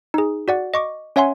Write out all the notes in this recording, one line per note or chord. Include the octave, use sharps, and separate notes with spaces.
D#4 G#4
F#4 D5 F#5
D#5 C#6 D6
C#4 C#5 E5 F#5 G#5 C6